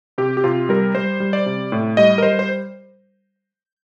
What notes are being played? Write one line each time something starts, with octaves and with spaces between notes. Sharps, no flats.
C3 G4
G4
C3 F4
G3 A#4
G3 C5
G3
D5
C3
A2
G3 D#5
A#4
G3 C5
C5